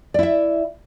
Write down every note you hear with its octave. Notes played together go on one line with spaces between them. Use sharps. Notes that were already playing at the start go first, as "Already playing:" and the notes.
E4 D5 E5